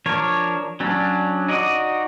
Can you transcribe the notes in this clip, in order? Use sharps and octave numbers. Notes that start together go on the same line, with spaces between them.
F3 D4 A#4 C#5
F#3 C#4 D4
D#4 F#4 D5 D#5